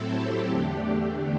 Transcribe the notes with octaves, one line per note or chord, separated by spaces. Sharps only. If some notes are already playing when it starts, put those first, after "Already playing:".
Already playing: A2 F#3 C4 E4 A4
G4
E2 D3 A3 D4